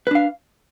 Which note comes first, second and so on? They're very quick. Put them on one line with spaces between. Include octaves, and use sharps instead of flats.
B4 D4 F5